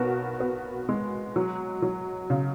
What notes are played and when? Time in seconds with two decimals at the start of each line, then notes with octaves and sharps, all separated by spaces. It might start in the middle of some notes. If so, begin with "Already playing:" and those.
Already playing: B1 B3 F#4 A#4
0.40 B3
0.89 G#3
1.36 F#3
1.82 F#3
2.30 C#3